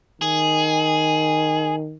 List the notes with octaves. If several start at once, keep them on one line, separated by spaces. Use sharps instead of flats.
D#3 G#4